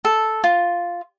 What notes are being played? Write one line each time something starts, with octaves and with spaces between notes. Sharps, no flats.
A4
F4